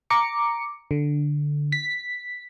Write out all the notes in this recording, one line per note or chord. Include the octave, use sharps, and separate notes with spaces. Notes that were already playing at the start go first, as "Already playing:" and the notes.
A#5 D6 C#7
D3
B6